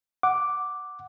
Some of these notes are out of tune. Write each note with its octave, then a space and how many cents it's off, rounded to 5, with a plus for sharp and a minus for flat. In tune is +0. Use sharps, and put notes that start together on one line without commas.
F#5 +0 D6 +0